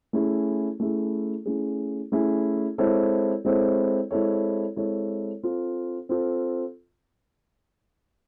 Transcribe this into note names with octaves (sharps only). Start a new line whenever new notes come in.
A3 C#4 E4 G#4
A3 C#4 E4 G#4
A3 C#4 E4 G#4
A3 C#4 E4 G#4
G#3 C4 E4 A4 C#5
G#3 C4 E4 A4 C#5
G#3 C4 E4 A4 C#5
G#3 C4 E4 A4 C#5
C4 F4 A4
C4 F4 A4